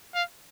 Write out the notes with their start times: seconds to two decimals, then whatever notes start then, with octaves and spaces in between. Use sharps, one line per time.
0.15 F5